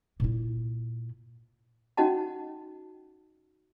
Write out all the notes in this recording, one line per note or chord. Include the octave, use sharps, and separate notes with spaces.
A#2 E4
C#4 D#4 F#4 D#5 F#5 A5